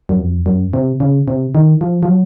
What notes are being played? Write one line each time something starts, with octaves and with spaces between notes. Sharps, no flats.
F#2
F2
F#2
C3
C#3
C3
D#3
F3
F3
F#3